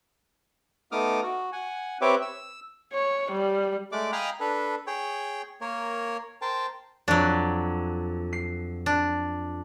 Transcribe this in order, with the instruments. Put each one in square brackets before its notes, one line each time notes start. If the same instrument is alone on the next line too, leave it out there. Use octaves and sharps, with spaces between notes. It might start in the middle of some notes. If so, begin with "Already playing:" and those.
[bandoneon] A3 B3 D#4 D6 D#6 F6
F#4
F#5 G#5
C4 G4 B4 C#5 E5 D6
E6
[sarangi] C#5
G3
[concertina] G#3 A3 D5 D6
D#5 F5 G5 G#5 A#5 B5
D4 A4 B4
G#4 C#5 G5
A#3 A#4 C#5
A#4 C5 G5 A5
[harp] F2 [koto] F#3 D4
[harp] C7
[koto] D4